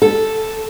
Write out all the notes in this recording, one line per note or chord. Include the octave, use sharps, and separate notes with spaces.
A4